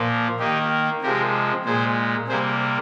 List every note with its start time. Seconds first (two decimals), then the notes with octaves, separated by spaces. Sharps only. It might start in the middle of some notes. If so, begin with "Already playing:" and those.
Already playing: A#2 F3 A#3
0.39 D#3 A#3 D#4 G4
1.02 C3 F3 G#3 G4 A#4
1.65 A#2 G#3 G#4 C5
2.28 C3 G3 A#3 G#4 C5